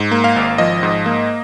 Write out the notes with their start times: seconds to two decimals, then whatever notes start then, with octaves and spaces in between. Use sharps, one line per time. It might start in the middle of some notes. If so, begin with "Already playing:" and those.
Already playing: G#2
0.11 A#3
0.24 F5
0.36 G#1
0.58 F3 D#5
0.83 G#2
1.06 A#3